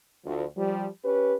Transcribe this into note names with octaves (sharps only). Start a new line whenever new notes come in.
D2 F3
F3 G3
C#4 G4 B4